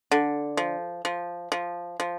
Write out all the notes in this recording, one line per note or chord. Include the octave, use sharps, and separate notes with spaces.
D3
F3
F3
F3
F3